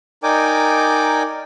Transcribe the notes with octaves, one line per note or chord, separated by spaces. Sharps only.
D#4 A#4 D5 G5 G#5 D6